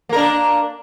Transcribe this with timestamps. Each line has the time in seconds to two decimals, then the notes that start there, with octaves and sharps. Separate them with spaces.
0.09 A#3
0.13 A#4
0.16 D4